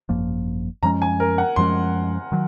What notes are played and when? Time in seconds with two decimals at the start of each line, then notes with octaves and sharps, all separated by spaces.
0.09 G#1 F#2 F3 A#3
0.83 F#2 F3 G#3 C#4 A#5
1.02 G#5
1.20 A#4
1.38 F#5
1.56 F#2 F3 G#3 C#4 C6
2.32 D#3 F#3